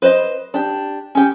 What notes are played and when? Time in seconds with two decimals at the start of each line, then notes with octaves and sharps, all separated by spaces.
0.02 B4 C5 D5 D#5
0.54 D4 G4
1.15 C#4 G4